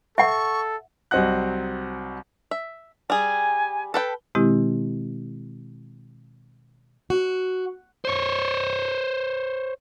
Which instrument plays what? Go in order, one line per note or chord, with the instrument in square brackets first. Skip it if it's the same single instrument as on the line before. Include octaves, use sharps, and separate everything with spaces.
[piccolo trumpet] A4 [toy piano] E5 F#5 [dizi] C#6
[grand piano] C2 F#3 C4 D#5 F#5 F#6
[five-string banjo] E5
[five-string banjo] G3 G#4 [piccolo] G#5
[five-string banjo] A4 B4 G5
[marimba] B2 D#3 G#3 C4 E4 G4
[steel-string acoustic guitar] F#4
[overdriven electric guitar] C5 C#5